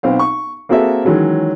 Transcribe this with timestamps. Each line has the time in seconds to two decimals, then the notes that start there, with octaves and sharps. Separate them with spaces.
0.03 B1 C4 F5
0.19 C#6
0.69 A#3 C4 F#4 G#4 A4 E5
1.04 D#3 E3 F#3 G#3 C#4